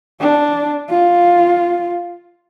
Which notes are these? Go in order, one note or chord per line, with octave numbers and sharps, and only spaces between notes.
D4
F4